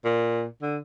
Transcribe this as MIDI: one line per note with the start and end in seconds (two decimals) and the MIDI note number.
0.05 0.45 46
0.62 0.78 50